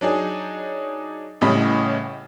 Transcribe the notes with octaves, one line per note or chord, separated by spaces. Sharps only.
F#3 D4 D#4 G#4
A1 A2 C#3 G3 D#5 B5